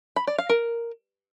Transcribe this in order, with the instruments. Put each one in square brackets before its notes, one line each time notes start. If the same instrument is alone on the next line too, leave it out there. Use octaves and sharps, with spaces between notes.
[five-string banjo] B5
D5
F5
A#4